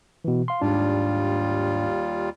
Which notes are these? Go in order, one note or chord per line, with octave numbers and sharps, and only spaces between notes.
B2 E3
F5 C6
D#2 G#2 G3 D4 F4